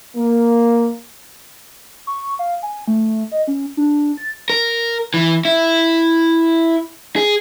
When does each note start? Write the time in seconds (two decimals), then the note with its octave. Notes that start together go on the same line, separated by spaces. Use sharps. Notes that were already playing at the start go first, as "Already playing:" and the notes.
0.17 A#3
2.07 C#6
2.39 F5
2.63 G#5
2.88 A3
3.32 D#5
3.47 C#4
3.77 D4
4.17 A6
4.50 A#4
5.14 E3
5.45 E4
7.16 G#4